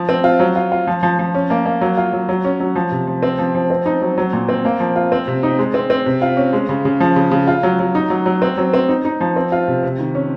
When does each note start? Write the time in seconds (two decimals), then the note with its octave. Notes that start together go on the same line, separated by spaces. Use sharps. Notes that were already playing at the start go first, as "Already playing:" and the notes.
Already playing: F3
0.09 C4
0.24 F4
0.40 F#3
0.56 F4
0.72 F4
0.87 F3
1.03 F3
1.19 F3
1.35 C#4
1.50 A#3
1.65 A#3
1.81 F#3
1.97 F4
2.13 F#3
2.29 F#3
2.44 C#4
2.60 F#3
2.75 F3
2.91 C3
3.07 F3
3.23 C4
3.39 F3
3.55 F3
3.70 C4
3.86 D#4
4.01 F#3
4.18 F#3
4.33 A#2
4.49 C4
4.65 A#3
4.80 F3
4.96 F4
5.12 C4
5.28 C3
5.43 D#4
5.59 G#3
5.74 C4
5.90 C4
6.06 C3
6.22 F4
6.37 C#4
6.53 G#3
6.69 C#3
6.85 C#3
7.00 F3
7.16 C#3
7.31 C#3
7.48 F4
7.63 F#3
7.79 F#3
7.95 D#4
8.10 F#3
8.26 F#3
8.42 C4
8.58 F#3
8.73 C4
8.89 D#4
9.05 D#4
9.21 F3
9.36 C4
9.52 F4
9.68 C3
9.83 C3
9.99 D#3
10.15 C#4